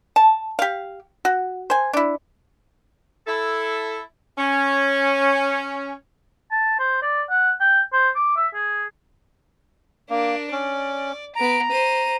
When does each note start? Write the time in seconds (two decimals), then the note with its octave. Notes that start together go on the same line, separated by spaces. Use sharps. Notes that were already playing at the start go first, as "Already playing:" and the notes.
0.16 A5
0.59 G4 F5
1.25 F#4
1.70 C5 G#5
1.93 D4 E4
3.27 E4 A4
4.37 C#4
6.52 A5
6.79 C5
7.03 D5
7.30 F#5
7.60 G5
7.93 C5
8.15 D6
8.36 E5
8.54 G#4
10.10 A#3 D4 A#4
10.52 C#4 D5
11.36 B3 A#5 D7
11.71 C5 D#7